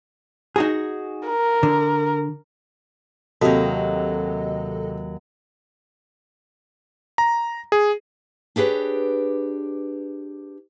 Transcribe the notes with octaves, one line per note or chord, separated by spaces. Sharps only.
D#4 F#4 G#4
A#4
D3
D#2 C3 F#3 F#4 A4 D#5
A#5
G#4
D4 G4 G#4 B4 C#5